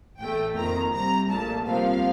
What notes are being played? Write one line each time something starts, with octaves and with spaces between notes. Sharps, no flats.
A1 A2 A3 G5
F2 D#3 A#3 A#5
C2 C3 G3 A#5
A#1 A#2 A3 A5
C2 C3 F3 A#3 F5